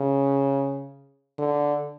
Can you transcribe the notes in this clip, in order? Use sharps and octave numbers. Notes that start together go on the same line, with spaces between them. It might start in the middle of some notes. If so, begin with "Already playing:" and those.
Already playing: C#3
D3